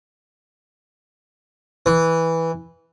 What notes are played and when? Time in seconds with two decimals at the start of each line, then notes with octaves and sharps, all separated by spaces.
1.86 E3